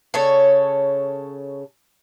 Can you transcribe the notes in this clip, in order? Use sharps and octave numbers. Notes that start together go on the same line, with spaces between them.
C#3 A4 C#5